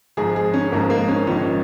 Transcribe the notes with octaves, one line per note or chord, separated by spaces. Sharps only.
G#1 G#2 F3 G#4
G#4
C#4
G#1 G#2 F3 A#3
A#3
C#4
A#1 G#2 D#3 C#4